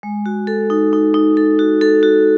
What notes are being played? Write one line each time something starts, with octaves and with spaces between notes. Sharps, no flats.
G#3
F#4
A4
D#4
D#4
D#4
A4
F#4
A4
F#4